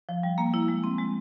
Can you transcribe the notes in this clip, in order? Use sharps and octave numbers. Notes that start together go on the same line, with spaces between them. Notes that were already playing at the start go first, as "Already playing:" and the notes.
F3
G3
A#3
E4
G#3
C4
G#3